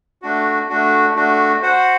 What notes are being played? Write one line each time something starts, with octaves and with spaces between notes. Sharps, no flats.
A3 D4 F#4
A3 D4 F#4
A3 D4 F#4
F#4 C5 F#5